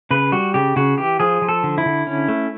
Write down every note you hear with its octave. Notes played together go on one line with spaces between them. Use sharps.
C#3 B4
G3 F#4
C#3 G4
C#3 F#4
E3 G4
F3 G#4
F3
A4
D3
E4
D3
C#4
A3